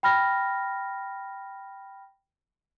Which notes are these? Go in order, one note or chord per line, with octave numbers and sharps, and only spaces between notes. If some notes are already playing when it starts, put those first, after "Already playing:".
G5 B5 F6 A#6